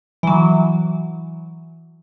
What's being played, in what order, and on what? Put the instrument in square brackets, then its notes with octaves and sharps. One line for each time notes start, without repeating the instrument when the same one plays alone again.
[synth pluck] E3 F#3